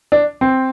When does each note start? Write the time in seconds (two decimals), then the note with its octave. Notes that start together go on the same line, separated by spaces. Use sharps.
0.12 D4
0.41 C4